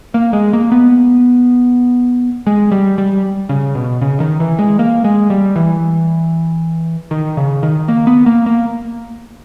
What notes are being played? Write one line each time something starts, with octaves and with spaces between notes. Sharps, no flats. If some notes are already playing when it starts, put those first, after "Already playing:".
A#3
G#3
A#3
B3
G#3
G3
G3
C#3
B2
C#3
D#3
E3
G#3
A#3
G#3
G3
E3
D#3
C#3
D#3
A#3
B3
A#3
A#3